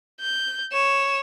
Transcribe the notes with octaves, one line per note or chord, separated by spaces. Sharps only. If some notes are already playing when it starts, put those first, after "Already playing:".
G6
C#5 E7